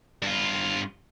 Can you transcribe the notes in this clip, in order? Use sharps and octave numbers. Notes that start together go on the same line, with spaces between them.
G2 F4